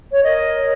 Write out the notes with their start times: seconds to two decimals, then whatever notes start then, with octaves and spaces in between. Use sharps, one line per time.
0.13 C#5
0.23 A#4 D#5
0.54 C#5